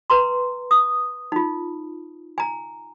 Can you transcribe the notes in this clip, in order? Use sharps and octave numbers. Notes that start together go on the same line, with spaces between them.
B4 A#5 C6
D#6
D#4 F4
G#5 A#5